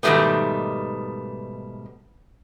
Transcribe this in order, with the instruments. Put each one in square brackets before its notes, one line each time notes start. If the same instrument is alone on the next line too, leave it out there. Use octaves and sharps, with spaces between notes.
[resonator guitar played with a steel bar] G#2 B2 D#3 G3 A3 B3